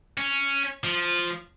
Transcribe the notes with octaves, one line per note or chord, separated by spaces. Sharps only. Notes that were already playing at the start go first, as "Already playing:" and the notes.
C#4
F3